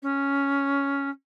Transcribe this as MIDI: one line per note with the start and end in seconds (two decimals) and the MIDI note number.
0.02 1.09 61